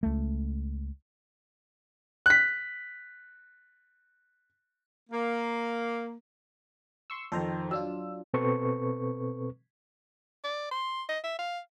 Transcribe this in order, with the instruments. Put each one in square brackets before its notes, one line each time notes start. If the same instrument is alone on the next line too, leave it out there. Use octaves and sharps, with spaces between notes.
[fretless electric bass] C#2 A3
[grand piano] F#6 B6
[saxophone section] A#3
[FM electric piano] C6 C#6 E6
[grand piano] F2 D#3 [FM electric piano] A4 C5 A#5
[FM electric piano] F#3 D4 F4 [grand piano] E6
[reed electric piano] B2 C4 A4 B4 C#6
[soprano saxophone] D5
C6
D#5
E5
F5